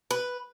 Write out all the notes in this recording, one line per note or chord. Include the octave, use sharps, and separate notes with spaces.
B4